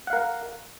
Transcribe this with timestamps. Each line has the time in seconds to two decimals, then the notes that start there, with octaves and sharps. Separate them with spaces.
0.07 F#5
0.10 F5
0.13 A#4